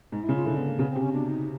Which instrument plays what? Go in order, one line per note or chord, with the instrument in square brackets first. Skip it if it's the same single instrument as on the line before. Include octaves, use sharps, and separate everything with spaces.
[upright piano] G#2 [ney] D#4
[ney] E4
[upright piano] C#3
[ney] F4
[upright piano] D3 [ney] E4
[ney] B3
A#3
[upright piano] C#3 [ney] B3
[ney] C4
[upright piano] C3
[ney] C#4
[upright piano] B2 [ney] D4
[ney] D#4